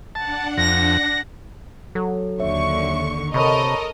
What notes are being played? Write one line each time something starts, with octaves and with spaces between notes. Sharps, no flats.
D4 F#5 A5
F2 A#6
F#3 A4
D#2 D3 C#5 E5 C#6
C3 A4 A#4 C#5 D#5 B5 C#6